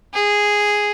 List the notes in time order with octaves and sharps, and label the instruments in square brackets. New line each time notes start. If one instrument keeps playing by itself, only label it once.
[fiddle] G#4